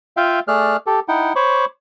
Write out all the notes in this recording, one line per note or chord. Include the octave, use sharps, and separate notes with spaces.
F4 E5 F5 G5
A3 G#4 D5 F6 F#6
G4 A4
D#4 E4 F#5 G5
C5 C#5 B5 C#6 D6